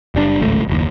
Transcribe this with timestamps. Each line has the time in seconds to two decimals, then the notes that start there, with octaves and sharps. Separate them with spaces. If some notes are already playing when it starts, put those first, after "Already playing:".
0.15 F#1 G3 D4
0.40 D1 G#1 C#2 A3
0.68 F#1 D#2